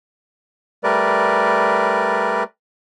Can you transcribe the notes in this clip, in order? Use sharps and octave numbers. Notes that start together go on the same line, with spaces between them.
G3 A3 A#4 B4 D5